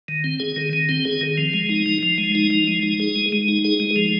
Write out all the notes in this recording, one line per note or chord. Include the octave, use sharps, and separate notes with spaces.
D#3
C4
G#4
D#3
D#3
C4
G#4
D#3
F3
G#3
D#4
F3
F3
G#3
D#4
F3
G#3
D#4
G#4
G#3
G#3
D#4
G#4
G#3
F3